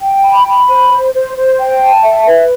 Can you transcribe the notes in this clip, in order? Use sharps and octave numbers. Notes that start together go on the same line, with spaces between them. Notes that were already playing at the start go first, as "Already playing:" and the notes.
G5
B5
B5
C5
C5
C5
C5
G5
A5
E5
B4